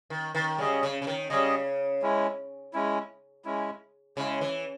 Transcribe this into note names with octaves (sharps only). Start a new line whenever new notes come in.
D#3
D#3
C#3 G3 C#4 G#4 D#5
C#3
C#3
D#3
C#3 G3 C#4 G#4 D#5
G#3 C#4 E4
G#3 C#4 E4
G#3 C#4 E4
C#3 G#3 C#4 E4
E3